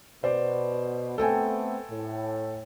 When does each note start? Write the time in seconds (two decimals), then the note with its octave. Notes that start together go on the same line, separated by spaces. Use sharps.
0.23 B2 B4 C5 D5
1.18 A3 B3 C4 A4 G5 G#5
1.90 A2